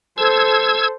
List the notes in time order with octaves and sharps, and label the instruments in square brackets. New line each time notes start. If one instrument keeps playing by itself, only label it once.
[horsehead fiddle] A4 C5 [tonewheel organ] E6 G#6